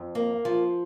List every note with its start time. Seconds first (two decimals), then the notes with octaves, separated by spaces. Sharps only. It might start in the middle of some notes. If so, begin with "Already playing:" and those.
Already playing: F2
0.15 A#3
0.45 F3